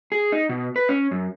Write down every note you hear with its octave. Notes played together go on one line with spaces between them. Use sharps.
G#4
D#4
B2
B4
C#4
F#2